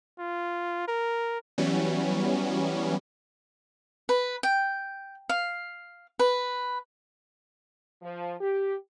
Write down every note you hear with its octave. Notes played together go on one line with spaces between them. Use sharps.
F4
A#4
E3 F#3 G3 B3 C#4
B4
G5
F5
B4
F3
G4